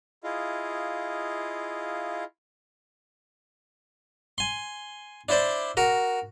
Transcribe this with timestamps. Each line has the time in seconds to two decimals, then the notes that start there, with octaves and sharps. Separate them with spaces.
0.24 E4 F4 G#4 D#5 F5
4.38 G#5 C6
5.29 D4 E4 C5 D5
5.77 F#4 A#4